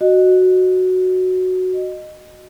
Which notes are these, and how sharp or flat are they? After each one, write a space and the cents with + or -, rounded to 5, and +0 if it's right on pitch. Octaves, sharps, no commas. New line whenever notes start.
F#4 +0 D#5 -15